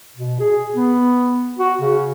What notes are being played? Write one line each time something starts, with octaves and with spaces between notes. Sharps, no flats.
B2
G#4
B3
F#4
C#3